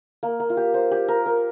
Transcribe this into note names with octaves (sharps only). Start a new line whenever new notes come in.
A#3
A#3
F4
G4
C5
G4
A#4
A#4